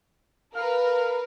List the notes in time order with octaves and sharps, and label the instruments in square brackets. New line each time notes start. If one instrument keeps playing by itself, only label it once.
[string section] A#4 B4 [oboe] F5